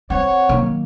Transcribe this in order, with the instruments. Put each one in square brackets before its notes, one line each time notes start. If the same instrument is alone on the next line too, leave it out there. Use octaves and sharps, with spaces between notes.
[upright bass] C4 [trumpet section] C#5 [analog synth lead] F#5
[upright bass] D#3 F#3 [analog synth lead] A#3